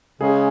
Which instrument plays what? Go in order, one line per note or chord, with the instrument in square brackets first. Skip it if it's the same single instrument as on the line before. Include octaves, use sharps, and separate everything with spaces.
[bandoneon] C#3 G#3 C#4 [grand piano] G#4